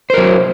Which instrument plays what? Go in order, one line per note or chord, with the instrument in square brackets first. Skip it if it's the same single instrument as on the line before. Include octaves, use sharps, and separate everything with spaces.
[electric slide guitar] C5
A#4
F#3